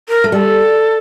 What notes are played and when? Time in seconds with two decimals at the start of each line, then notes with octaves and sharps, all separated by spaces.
0.09 A#4
0.24 A3
0.32 G3 A4